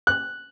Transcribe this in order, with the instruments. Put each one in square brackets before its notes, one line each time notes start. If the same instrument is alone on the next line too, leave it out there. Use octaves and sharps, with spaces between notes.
[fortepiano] F#6